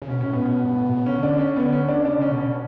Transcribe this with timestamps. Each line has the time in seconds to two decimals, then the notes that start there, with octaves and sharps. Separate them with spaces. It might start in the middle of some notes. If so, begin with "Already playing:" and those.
0.02 C#3
0.08 B2 C#4
0.21 A2 C#4
0.33 B2 B3
0.45 B3
0.64 G2
0.75 A2
0.86 B2
0.97 C#3
1.06 D3 C#4
1.23 D4
1.39 C#4
1.56 B3
1.73 C#4
1.89 D4
2.05 C#3 D4
2.19 C#3 C#4
2.30 B2
2.38 C#4